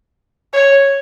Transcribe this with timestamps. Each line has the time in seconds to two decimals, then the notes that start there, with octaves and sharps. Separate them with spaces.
0.53 C#5